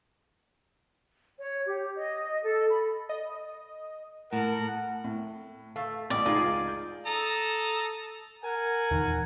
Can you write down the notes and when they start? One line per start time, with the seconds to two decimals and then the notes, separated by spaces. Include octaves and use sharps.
1.39 C#5
1.66 G4
1.96 D#5
2.43 A4
2.70 B5
3.09 D#5
4.33 A2 A#4 F#5 A5
5.04 A2
5.76 A3 F5
6.10 A1 G3 D5 D#6
6.26 C#2 D#4 F4 G#4
6.68 G6
7.06 A4 A#5 D#6
8.42 A#4 F#5 G#5
8.91 D#1 E2 D#3